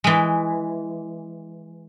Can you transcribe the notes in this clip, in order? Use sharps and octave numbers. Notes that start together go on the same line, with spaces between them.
E3 G#3